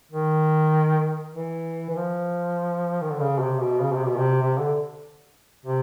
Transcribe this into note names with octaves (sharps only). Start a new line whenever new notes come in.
D#3
E3
E3
F3
D#3
D3
C#3
C3
B2
C#3
C3
B2
C3
C3
D3
C3